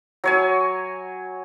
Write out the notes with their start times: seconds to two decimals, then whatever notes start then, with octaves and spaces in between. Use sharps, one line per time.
0.24 F#3 C#5 G#5